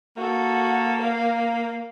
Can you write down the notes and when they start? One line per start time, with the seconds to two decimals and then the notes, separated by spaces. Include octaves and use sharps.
0.17 A#3 F#4 A4
1.02 F5